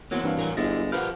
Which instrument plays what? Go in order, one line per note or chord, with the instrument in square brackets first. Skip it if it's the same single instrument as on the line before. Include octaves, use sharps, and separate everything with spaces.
[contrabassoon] E2 [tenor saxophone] F#3 [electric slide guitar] A#3 C4 F#4
[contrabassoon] G2 [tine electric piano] E3 D4 F5
[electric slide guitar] A2 A#4 G#5
[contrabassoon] G1 [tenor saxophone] G#3 [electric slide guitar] E4 G4 [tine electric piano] A6 A#6
[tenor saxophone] F3 [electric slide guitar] G4 A#4 F#5 [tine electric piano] B4 F6